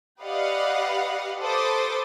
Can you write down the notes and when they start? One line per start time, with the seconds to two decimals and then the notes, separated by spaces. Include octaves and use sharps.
0.20 G4 B4 D5 D#5 F5 F#5
1.40 A4 B4 C5 D6 D#6 A6